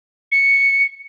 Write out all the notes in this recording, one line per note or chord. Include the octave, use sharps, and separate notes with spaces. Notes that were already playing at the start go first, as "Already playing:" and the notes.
C#7